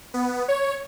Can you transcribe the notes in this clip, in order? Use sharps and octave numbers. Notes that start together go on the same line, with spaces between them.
B3
C#5